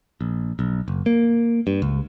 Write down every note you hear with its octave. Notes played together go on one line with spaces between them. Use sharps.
A#1
B1
F#1
A#3
G2
C#2